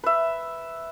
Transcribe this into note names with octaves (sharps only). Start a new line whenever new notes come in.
B4 E5